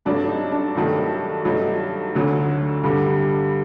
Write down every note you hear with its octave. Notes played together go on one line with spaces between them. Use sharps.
G2 F#3 A3 D4
D#4
D4
G2 D#3 F#3 A3
G2 F#3 A3 D#4
D2 D3 F#3
G2 D3 G3